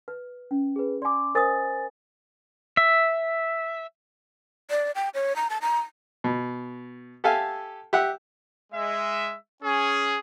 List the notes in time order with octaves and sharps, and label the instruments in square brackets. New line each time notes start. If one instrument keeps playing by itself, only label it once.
[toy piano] B4
C#4
[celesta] G#4 B4
[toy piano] D5 G#5 [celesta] C6 D6
[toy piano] A#4 D#5 D#6 [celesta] C5 G#5 A6
[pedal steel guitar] E5
[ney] D5
G5
C#5
A#5
A5
A#5
[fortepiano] B2
G4 A4 E5 F5 G#5
G4 E5 F#5
[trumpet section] G#3 E5
C#4 G#4